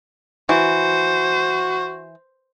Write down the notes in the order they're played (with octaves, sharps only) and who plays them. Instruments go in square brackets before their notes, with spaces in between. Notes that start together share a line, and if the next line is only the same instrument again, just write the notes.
[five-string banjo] E3 [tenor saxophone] F#4 [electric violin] C5